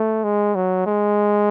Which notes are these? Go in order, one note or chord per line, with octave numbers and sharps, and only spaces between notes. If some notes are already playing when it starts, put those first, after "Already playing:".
Already playing: A3
G#3
F#3
G#3